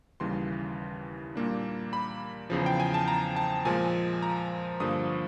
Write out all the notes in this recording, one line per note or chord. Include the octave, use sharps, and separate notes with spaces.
D#2 C#3 E3 G3 C6
A#2 G3 A#3 D4
B5
E2 C#3 F3
G5
G#5
A5
A#5
A5
A#2 F3 G#3 G#5
A#5
G2 D3 F3 A#3 D#6